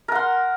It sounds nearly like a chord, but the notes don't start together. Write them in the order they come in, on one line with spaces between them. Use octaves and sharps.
A#4 F#5 C6